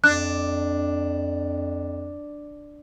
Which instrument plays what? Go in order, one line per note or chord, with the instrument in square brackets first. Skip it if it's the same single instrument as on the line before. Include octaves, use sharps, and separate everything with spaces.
[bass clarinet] F2 [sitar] D4 [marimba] F#6